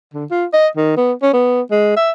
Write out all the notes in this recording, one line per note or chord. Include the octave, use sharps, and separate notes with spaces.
D3
F4
D#5
D#3
B3
C#4
B3
G#3
E5